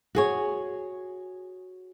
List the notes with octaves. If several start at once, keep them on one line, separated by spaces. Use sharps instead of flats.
F#4 G#4 C#5